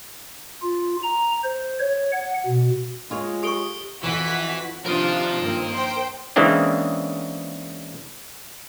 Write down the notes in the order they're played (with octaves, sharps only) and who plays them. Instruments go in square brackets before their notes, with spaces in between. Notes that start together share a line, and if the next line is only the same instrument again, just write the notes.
[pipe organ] F4
A#5
C5
C#5
F#5
B2
[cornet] G#3 [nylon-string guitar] F4 C#5
[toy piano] G4 A4 C#6 [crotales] D#6 D7 G7
[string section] F2 F#4 B6 [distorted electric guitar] E3
[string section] C3 D4 F4 [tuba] F3 [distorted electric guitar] A#4 D#5
[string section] G2 A#3 C4
C5 G5
[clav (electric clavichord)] C#3 E3 G#3 A#3 C4 D4